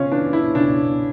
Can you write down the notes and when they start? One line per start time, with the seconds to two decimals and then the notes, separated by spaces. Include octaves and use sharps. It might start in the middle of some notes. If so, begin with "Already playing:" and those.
Already playing: C#3 C#4 F4
0.12 E3 D4
0.33 E4
0.55 C#3 D4